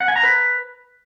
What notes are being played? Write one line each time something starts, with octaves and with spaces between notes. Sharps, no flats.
F#5
G#5
A#5
B4